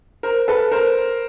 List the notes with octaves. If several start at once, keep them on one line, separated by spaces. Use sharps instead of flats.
A#4 C5
A4 B4
A#4 C5